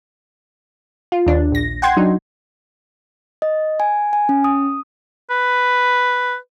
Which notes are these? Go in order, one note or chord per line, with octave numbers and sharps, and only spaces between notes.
F4
D#2 D4
A#1 A#6
F#5 G5 C6 G#6
F#3 D4 D#4
D#5
G#5
G#5
C#4
D#6
B4